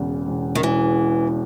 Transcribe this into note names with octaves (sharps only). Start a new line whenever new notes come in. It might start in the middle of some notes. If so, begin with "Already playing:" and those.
Already playing: E1 E2 C#3
E1
D#3
E1 E3